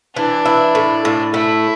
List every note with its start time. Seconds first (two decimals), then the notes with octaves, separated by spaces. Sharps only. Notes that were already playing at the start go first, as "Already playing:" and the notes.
0.16 E3 D4
0.45 E4
0.75 A2
1.05 A2
1.34 A3 E4